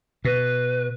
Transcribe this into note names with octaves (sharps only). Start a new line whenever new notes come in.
B2 B4